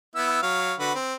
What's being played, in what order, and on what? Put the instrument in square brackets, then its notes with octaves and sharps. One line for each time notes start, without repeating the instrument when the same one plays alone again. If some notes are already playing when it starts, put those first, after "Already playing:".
[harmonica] B3 E4 E6
F#3 C#5 F5
D3 F#4 B4
C4